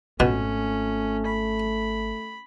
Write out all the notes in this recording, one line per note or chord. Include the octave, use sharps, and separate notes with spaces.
G#1 B2 A3 C#4 F4
B5